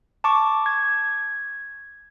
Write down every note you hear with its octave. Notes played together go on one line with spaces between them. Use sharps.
A5 C#6 D6
G#6